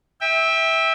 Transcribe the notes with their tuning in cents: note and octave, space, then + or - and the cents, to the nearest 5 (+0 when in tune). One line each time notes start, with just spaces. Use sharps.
E5 -15 G5 +20